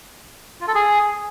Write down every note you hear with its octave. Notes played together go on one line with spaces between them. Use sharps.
F4
A4
G#4